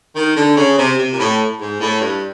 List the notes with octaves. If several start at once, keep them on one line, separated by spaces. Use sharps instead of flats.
D#3
D3
C#3
C3
C3
A#2
A2
G#2
A2
G2